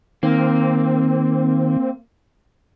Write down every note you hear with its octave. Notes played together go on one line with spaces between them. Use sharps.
D#3 A#3 C4